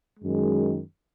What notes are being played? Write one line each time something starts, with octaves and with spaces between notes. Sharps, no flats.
F#2 D#3 G#3